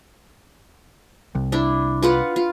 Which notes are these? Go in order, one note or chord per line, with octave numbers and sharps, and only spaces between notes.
C2
D4 E4
F4 B4 F#5
F4